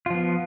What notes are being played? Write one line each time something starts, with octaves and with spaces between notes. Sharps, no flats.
F3 B3 F4